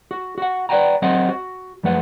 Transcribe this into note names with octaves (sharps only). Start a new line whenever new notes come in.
F#4
F#4 F#5
B4 D5 E5 F#5 G5 A#5
F#3 C4 C5 D#5 F#5
F#4
F#2 F3 A3 B4 F#5